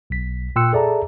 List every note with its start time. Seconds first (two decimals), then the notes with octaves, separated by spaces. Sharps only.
0.10 B1 B6
0.56 A#2 G5 C6 E6 F#6 C#7
0.73 G#4 A4 D5 E5 A5 A#5